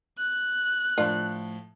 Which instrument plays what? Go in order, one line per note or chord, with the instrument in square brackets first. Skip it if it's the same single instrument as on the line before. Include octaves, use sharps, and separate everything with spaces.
[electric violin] F#6
[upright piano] A2 F3 [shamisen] D4 F4 A#4